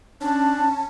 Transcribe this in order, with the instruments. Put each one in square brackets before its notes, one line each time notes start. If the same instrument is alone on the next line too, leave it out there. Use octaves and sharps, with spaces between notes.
[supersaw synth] C#4 [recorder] D4 [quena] A5